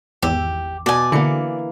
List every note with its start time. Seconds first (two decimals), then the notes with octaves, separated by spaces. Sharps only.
0.22 G#1 E2 G4 E6
0.86 B2 D5 G#5
1.12 D3 E3 A#3 C#7